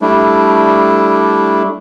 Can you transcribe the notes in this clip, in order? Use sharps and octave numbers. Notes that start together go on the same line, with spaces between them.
G3 A3 D4 E4